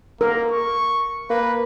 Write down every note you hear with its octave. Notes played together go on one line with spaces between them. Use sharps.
A#3 A#4
C#6
A#3 B4